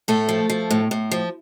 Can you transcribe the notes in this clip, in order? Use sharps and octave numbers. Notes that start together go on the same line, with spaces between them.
A2 A3 A4
F3
F3
A2
A2
F3